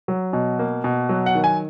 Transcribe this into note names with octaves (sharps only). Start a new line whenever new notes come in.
F#3
B2
A#3
B2
F#3
F#5
D#3
G#5